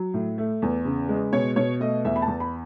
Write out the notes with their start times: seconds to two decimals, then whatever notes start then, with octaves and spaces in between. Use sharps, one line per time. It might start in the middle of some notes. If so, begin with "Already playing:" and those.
Already playing: F#3
0.14 A2
0.38 A3
0.62 E2
0.85 C#3
1.09 G#3
1.33 B2 C#5
1.56 B2 C#5
1.80 A3 D#5
2.05 E2 E5
2.16 B5
2.22 A5
2.28 E2
2.40 B5